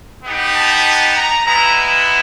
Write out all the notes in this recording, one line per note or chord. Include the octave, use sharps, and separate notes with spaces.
B3 D#4 G4
A5
A#5
G#3 B3 E4 A#5